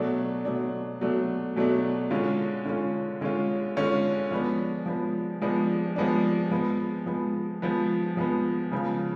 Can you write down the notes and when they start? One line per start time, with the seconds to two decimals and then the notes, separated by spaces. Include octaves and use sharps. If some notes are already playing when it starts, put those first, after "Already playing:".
Already playing: B2 F#3 A3 D4
0.45 B2 F#3 A3 D4
1.01 B2 F#3 A3 D4
1.56 B2 F#3 A3 D4
2.11 D3 G#3 C#4 F4
2.65 D3 G#3 C#4 F4
3.21 D3 G#3 C#4 F4
3.76 D3 G#3 C#4 F4
4.31 F3 G#3 B3 D4
4.86 F3 G#3 B3 D4
5.42 F3 G#3 B3 D4
5.96 F3 G#3 B3 D4
6.51 F3 G#3 B3
7.06 F3 G#3 B3
7.62 F3 G#3 B3
8.17 F3 G#3 B3
8.72 C#3 F3 G#3 B3